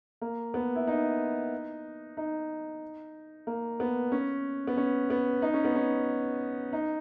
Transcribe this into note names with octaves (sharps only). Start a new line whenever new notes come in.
A#3
B3
E4
D#4
D#4
A#3
B3
C#4
B3
C#4
B3
D#4
C#4
B3
C#4
D#4